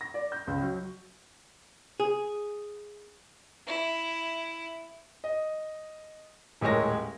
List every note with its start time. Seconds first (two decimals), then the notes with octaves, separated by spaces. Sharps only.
0.01 A#6
0.14 D5
0.32 G6
0.47 C#2
0.62 F#3
2.00 G#4
3.68 E4
5.24 D#5
6.61 D#1 A2 G#3 A#4 C#5 A#6